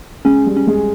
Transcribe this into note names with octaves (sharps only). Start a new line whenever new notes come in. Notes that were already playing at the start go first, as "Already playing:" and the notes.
G#3 C#4
G3
C#4
G#3